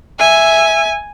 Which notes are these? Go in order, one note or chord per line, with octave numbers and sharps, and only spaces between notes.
E5 G#5